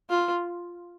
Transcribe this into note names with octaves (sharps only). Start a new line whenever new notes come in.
F4